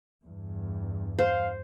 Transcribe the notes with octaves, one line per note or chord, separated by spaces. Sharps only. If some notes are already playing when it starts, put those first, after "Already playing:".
E2 G2
C5 F5